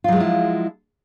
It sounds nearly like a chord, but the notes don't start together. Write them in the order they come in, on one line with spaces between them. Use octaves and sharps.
F4 F#3 G#3 F3 E4